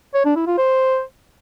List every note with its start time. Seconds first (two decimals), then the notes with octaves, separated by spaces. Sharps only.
0.14 C#5
0.25 D4
0.36 E4
0.47 F4
0.58 C5